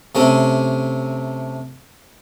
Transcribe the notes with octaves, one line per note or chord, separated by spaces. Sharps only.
C3 A3 C4 C#4